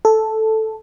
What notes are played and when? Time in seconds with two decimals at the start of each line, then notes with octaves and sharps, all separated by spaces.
0.05 A4